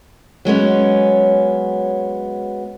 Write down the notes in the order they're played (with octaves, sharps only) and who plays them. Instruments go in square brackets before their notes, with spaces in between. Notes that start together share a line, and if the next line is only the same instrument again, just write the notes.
[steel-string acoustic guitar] F#3 G#3 B3 C#4